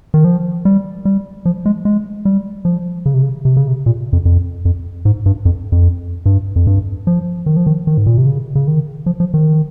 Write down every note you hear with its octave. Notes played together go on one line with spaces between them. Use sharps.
D#3
F3
G3
G3
F3
G#3
G#3
G3
F3
C#3
C3
C#3
C3
C#3
C3
A#2
F2
F2
F2
G#2
G2
F2
F2
G2
F2
G2
F3
D#3
F3
D#3
D#3
G#2
A#2
C3
C#3
C#3
D#3
F3
F3
D#3